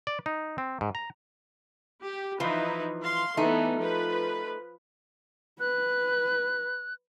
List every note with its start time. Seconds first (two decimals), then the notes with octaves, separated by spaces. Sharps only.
0.07 D5
0.26 D#4
0.58 C4
0.81 G#2
0.95 A#5
2.02 G4
2.40 E3 F3 D#4 E4 B4
3.02 F5 C6
3.37 E3 A3 B3 D#4
3.78 F3 B4
5.60 B4 F#6